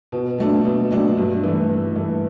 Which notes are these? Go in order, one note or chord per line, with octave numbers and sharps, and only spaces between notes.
B2
F#3 A3 D4
B2
F#3 A3 D4
G2
E3 A3
G2
E3 A3